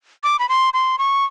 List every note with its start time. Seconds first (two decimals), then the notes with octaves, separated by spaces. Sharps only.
0.24 D6
0.39 B5
0.49 C6
0.74 C6
0.99 C#6